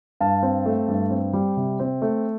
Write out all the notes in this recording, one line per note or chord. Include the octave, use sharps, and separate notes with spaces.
G2 F5 A5
C4
A3
G2
C4
G3
C3
C4
A3